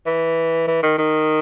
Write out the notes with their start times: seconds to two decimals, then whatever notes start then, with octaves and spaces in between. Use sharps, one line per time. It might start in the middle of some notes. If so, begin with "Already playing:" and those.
0.06 E3
0.67 E3
0.83 D#3
0.98 D#3